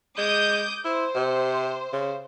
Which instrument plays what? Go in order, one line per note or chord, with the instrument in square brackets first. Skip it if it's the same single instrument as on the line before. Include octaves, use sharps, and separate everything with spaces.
[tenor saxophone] G#3 [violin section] D6 D#6 G6
[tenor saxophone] E4 [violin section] C5
[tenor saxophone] C3
C#3